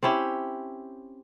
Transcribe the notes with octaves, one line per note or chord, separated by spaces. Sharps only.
C4 C#4 E4 G4